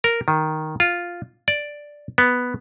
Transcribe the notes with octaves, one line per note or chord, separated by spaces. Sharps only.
A#4
D#3
F4
D5
B3